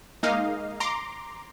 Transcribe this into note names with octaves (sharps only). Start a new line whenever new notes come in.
G#3 A#3 D#4 D#5 F5
A#5 C6 D6